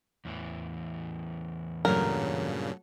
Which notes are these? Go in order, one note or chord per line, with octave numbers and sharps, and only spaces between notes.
E2 A2 E3
G2 A#2 C#3 F#3 A3 A#4 C#5